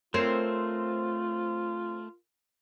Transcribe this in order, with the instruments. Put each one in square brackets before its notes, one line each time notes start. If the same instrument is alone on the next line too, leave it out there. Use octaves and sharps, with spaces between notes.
[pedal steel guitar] A3 [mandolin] C4 C5 [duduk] F4 [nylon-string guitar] A#4 C#5